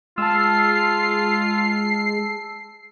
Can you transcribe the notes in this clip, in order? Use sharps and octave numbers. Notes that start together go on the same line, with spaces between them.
G#3 F4 A5 E6 C7